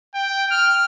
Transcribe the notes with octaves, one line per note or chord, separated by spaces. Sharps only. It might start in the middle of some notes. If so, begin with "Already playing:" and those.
G5
F6